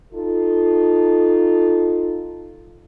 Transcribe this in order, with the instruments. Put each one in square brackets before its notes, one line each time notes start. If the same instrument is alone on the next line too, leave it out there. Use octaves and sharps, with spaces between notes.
[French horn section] D#4 F4 A4